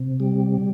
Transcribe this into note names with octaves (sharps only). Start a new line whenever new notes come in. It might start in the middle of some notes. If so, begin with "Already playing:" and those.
Already playing: C3
G3